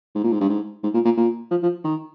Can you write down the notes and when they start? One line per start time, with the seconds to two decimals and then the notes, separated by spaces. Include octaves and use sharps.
0.15 G#2
0.23 A#2
0.32 G#2
0.40 G2
0.49 G#2
0.83 G#2
0.94 A#2
1.05 A#2
1.17 A#2
1.51 F3
1.63 F3
1.84 D#3